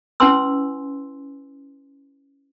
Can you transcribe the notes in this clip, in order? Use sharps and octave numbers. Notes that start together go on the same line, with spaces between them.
C#4 E4 B4 G#5 C6 E6